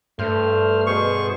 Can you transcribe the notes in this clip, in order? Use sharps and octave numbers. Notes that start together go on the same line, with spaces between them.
G2 A3 C5 F6
B2 G#4 C5 C#6